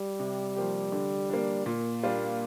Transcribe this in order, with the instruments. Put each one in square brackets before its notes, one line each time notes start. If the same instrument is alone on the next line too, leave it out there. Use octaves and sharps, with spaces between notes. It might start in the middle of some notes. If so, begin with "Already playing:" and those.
Already playing: [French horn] G3
[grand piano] C3
F3 A#3 G4
D3
A#3 D4
[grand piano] A#2 [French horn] A#3
[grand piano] G3 D4 F4